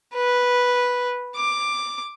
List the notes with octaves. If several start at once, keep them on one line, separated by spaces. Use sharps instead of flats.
B4
D6